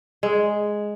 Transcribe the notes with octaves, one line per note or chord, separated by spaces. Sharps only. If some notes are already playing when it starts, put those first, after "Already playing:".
G#3